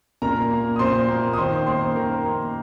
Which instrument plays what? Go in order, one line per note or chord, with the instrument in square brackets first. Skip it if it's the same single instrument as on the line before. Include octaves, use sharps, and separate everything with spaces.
[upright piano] A#2 A#4 A#5
A#3
D#6
A#2 C5 C6
A#3
D#6
D#3 C5 C6
A#3 C5 C6
D#3 A#4
A#3